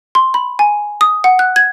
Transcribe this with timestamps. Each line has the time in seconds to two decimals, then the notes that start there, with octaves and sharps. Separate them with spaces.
0.15 C6
0.34 B5
0.59 G#5
1.01 D#6
1.24 F#5
1.39 F#6
1.56 G#6